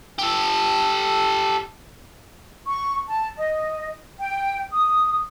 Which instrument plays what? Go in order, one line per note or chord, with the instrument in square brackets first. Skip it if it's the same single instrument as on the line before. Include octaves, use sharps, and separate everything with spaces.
[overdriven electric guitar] G4 A4
[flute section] C#6
A5
D#5
G5
D#6